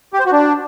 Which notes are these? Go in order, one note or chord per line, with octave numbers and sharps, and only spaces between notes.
G4
C5
F#4
D4